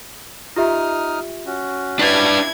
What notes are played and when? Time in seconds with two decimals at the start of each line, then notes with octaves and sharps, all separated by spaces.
0.56 D#4 F4 G4 E5 D#6 F6
1.46 C#4 F#4
1.99 D4 E4 B4 G#6 A6 B6